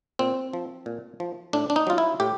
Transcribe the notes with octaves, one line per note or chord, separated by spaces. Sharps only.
A#2 C4
F3
A#2
F3
A2 D4
D4
D#4
F#3 F4
E4
A2 G4